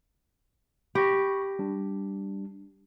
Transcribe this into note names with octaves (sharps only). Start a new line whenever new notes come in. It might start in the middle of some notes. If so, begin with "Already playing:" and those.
G4 B5 C#6 A#6
G3 D4